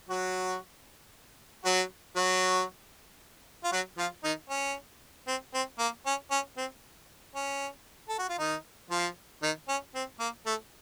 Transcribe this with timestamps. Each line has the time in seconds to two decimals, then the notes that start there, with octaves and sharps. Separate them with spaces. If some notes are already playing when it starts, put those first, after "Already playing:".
0.09 F#3 F#4
1.65 F#3 F#4
2.16 F#3 F#4
3.64 F4
3.72 F#3 F#4
3.98 F3 F4
4.24 D#3 D#4
4.50 C#4
5.27 C4
5.54 C4
5.79 A#3
6.06 C#4
6.31 C#4
6.57 C4
7.36 C#4
8.09 A4
8.19 F#4
8.29 F4
8.39 D#3 D#4
8.91 F3 F4
9.43 D#3 D#4
9.68 C#4
9.95 C4
10.20 A#3
10.46 A3